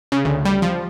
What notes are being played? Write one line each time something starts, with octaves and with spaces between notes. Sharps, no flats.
C#3
D2
G3
F3